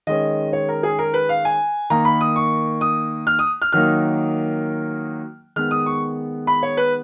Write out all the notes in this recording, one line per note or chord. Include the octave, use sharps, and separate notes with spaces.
D#3 G#3 C#4 D#5
C#5
A#4
G#4
A#4
B4
F5
G#5
D#3 A#3 D#4 A#5
B5
D#6
C#6
D#6
F6
D#6
F6
D#3 F#3 A#3 D#4 F6
D#3 G#3 B3 F6
D#6
C#6
B5
C#5
B4